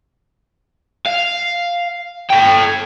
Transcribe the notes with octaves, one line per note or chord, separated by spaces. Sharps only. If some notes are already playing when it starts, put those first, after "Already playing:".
F5
A4 G5